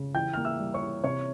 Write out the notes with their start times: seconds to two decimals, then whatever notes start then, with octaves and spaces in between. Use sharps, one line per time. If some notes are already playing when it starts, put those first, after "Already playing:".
Already playing: C#3
0.14 E3 G5 G6
0.33 A#3 F6
0.45 E5 E6
0.60 G3
0.74 C#5 C#6
0.82 E3
1.04 C3 C#5 C#6